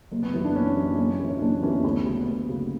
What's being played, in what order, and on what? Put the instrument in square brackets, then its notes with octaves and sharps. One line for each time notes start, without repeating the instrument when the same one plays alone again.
[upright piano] F#1
[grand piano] B3
[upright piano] F#2 E3 [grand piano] B3
[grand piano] D4
[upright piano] F#1 [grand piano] C#4
[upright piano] F#2 E3
F#1
F#2 E3
[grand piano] C#4
[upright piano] F#1 [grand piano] D4
[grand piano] B3
[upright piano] F#2 E3 [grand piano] C#4
[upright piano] D2 [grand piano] B3
[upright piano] C#3 F#3
D2
C#3 F#3